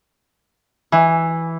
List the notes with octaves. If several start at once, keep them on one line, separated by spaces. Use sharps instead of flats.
E3